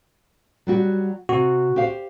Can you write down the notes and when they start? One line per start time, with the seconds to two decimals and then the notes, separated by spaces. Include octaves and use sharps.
0.67 F#3 G3 F#4
1.29 C3 F#4
1.76 G4 C5 F5